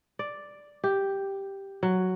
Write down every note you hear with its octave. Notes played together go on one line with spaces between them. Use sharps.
D5
G4
F#3